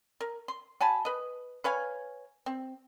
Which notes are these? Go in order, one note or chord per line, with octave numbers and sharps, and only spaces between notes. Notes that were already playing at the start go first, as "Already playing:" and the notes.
A#4
C6
F#4 G#5 A5 B5
B4 D#5
B4 C#5 F5 G#5
C4